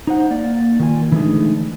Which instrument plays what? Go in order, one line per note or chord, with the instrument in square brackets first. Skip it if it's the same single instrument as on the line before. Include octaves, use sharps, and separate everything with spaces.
[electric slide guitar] D#4 C5 F#5
A#3 D5
D#3 F4 G#5
D3 E3 G#3 A3 D4 D#4